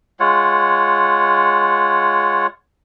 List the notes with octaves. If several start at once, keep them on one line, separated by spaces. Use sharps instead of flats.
G#3 F4 C#5 F#5